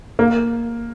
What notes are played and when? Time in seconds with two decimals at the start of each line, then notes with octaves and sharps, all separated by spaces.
0.19 A#3